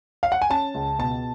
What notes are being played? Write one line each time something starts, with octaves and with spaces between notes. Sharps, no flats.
F5
F#5
G#5
C#4 A5
C#2
B2 A5